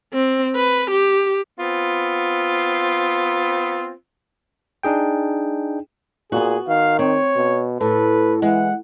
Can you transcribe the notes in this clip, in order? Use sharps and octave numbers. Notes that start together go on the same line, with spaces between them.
C4
B4
G4
B3 C4 F4
D4 D#4 G#4 G5
A#2 B3 F#4 G#4
D#3 F5
C4 C#5
B2
A2 A4 B4
E3 G#3 F#5